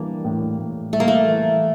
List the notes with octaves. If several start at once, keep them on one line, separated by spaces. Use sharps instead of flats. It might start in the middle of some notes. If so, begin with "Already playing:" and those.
Already playing: E3 G3 A#3 D4
A2
A2
G3 A3
A#3
A3
E3